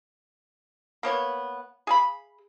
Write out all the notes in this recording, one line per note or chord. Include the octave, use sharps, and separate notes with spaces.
A#3 B3 C#5
G#4 F5 B5